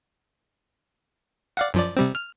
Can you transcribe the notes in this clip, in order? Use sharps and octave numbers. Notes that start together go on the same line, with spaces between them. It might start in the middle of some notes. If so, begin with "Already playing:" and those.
D5 F5 F#5
F#2 F3 D5
C3 G3 C4
F6